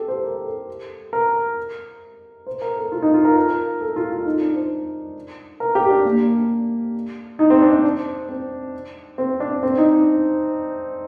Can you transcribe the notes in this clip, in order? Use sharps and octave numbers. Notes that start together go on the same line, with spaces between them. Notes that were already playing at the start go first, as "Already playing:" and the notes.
Already playing: G4 A4
C5
A#4
A4
A#4
C5
A#4
A4
F4
D#4
F4
A#4
A#4
A4
F4
F4
D#4
D4
C5
A#4
G4
D4
A#3
D4
D#4
C4
D4
D4
C4
C4
D4
C4
D#4
D4